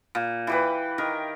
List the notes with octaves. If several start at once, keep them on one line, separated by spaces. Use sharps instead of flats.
A#2
E3 G4 B4
D#3 A#4